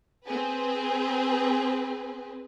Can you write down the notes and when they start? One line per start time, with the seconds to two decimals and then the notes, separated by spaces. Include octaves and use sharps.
0.25 C4 G#4 B4